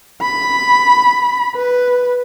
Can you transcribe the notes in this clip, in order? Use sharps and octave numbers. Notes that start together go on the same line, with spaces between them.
B5
B4